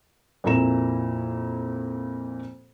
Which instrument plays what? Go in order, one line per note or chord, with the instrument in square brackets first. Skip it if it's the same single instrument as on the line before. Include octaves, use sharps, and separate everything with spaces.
[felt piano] F2 A#2 E4 A#4 A#5 E7